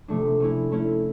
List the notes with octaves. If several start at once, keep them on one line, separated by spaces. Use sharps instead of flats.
C3 F3 A3 D4
A3 C#4 E4
A3 C#4 E4